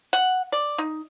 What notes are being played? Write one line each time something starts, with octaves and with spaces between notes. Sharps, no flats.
F#5
D5
D#4